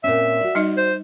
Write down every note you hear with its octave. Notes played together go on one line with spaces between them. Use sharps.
A#2 C4 C#4 E5
F#4 D5
G3 D#4 D#5
C5